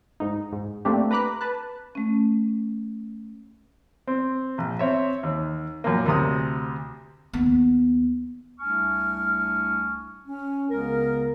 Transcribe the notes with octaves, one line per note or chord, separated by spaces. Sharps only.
G#2 D#4
G#2
A3 A#3 C4 D4 G4
B4 A#5 B5 D6 F#6
B4 A5 F#6
A3 C#4
C4
A#1
C4 C#5 E5
D#2
F#2 A#2 A#3
D2 C3 D#6
D#2 B3
C2 A3 D4 G#5 C#6 F6
C#4
C#2 C#3 B3 A#4